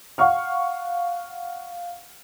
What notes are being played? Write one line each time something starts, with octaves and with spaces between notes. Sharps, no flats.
F5 F#5 C#6 F6